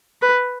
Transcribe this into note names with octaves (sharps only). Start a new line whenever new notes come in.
B4